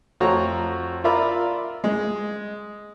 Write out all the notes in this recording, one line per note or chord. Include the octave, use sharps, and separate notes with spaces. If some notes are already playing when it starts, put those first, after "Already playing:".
F2 A3 F#4 C#5 A#5
F4 A#4 D5 E5 A#5 B5
G#3